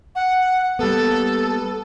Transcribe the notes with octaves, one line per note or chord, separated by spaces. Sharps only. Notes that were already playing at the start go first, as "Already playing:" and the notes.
F#5
G3 A#3 B3 A4